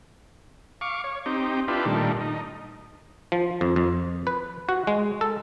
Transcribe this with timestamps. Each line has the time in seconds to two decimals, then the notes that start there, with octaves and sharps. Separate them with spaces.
0.81 F5 C#6 D6
1.04 C#5
1.26 C4 D#4 G4
1.68 D4 E4 F4 G4 B4
1.86 A#2 D#3 G3 A3 D4
2.20 D#4
3.32 F3
3.61 F2
3.76 F2
4.27 B4
4.69 F#4
4.87 G#3
5.21 A4